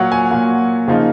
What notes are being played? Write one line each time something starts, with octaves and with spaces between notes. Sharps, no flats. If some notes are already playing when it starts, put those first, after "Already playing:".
Already playing: A#2 F#3 A#3 F#5
G#5
A#2 F#3 A#3
C#3 F3 A#3 D#4